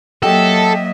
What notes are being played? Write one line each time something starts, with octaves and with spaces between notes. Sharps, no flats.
F#3 A#3 G4 A4 D#5 E5